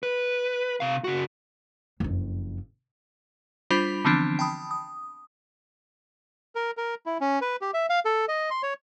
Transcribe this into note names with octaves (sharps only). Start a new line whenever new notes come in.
B4
C3 F5
C#3 F#4
F#1 F2
G3 D4 F4 C5 B5 B6
D3 E3 F3 B3 C4 D4
G5 A5 B5 D#6
D#6
A#4
A#4
E4
C#4
B4
G4
E5
F5
A4
D#5
C6
C#5